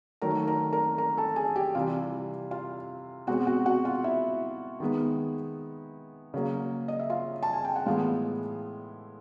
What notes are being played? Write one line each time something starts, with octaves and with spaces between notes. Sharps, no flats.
D#3 F#3 A3 A#4 A#5
A#4 A#5
A#4 A#5
A#4 A#5
A4 A5
G#4 G#5
G4 G5
C3 E3 G3 F4 F5
F4 F5
B2 G#3 C4 F#4 F#5
F#4 F#5
F#4 F#5
F4 F5
E4 E5
D#3 G#3 B3
C#3 F#3 A#3
D#5
E5
F4 F5
A5
G#5
G5
F#5
A2 E3 G#3 B3 F4 F5